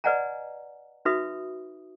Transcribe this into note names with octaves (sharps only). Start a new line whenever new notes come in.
B4 D5 D#5 F#5 G#5 A#5
D#4 F#4 B4 E5 B5 D#6